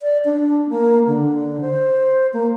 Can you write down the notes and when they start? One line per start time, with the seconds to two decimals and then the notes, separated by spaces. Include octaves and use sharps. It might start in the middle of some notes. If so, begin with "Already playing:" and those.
0.01 D5
0.25 D4
0.70 A#3
1.07 D3
1.61 C5
2.33 A#3